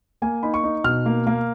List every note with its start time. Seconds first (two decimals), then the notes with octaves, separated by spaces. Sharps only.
0.22 A#3 G#5
0.43 D#4 B5
0.54 C#6
0.64 D#4
0.84 B2 F6
1.06 A#3
1.27 A#3